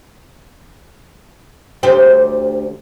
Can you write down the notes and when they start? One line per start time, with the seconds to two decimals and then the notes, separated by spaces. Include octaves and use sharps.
1.83 D2 G4 C5